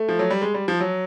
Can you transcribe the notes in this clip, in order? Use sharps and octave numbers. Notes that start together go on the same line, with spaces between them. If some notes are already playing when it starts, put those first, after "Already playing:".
Already playing: A3
F3
F#3
G3
G#3
G3
F3
F#3